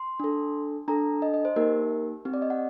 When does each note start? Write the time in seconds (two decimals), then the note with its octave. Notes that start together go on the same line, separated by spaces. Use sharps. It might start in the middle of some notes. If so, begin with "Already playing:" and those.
Already playing: C6
0.20 D4 A4
0.88 D4 A4 A#5
1.22 D#5
1.34 D#5
1.45 C5
1.56 A#3 D#4 G4 A#4
2.25 C4 G4
2.34 D5
2.42 D#5
2.50 F#5